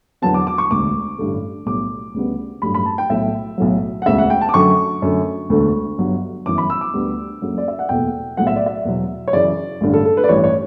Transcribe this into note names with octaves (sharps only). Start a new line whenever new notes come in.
E2 D3 F#3 B3 A5
D6
D6
C#6
E1 D2 D3 D6
A1 G2 D3 A3
B1 A2 G3 D6
D2 C#3 G3 B3
A1 G2 F#3 A3 B5
B5
A5
G5
B1 A2 F#3 E5
B1 A2 F#3
F#5
E1 D2 C#3 E5
F#5
G5
A5
D6
F#2 D3 F#3 A3 C#6
F#2 D3 A3
E1 D2 D3 A3
G1 G2 F#3
G1 F#2 E3 D6
B5
E6
D6
D2 D3 G3 B3
F#1 F#2 C#3 F#3 A3
D5
E5
F#5
F#1 E2 B2 A3 G5
B1 A2 F#3 F#5
E5
D5
E5
E2 B2 F#3
C#5
F#2 C#3 E3 D5
A1 G2 D3
A4
A4
B4
D5
A1 G2 E3 G3 C#5
C#5